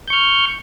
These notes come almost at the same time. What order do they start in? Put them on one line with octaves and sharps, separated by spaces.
G6 C#6 F6